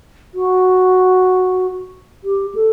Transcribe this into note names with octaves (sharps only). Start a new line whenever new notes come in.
F#4
G4
A4